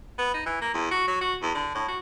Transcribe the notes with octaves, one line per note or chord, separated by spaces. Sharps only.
B3
D#4
E3
A#3
E2
F#4
F#3
F#4
E2
D3
A2
F#4